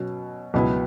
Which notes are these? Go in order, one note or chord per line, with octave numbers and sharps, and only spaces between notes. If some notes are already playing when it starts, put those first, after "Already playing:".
Already playing: B2 F#3 C#4
C#2 B2 F#3 B3 E4